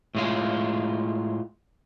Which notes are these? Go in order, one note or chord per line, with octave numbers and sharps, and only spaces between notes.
A2 G#3 F4